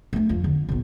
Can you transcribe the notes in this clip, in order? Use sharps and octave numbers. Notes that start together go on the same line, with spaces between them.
A3 D4
F2 F3
D3
A#1 B2